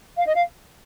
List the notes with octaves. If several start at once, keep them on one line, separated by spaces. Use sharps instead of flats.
F5
D#5
F5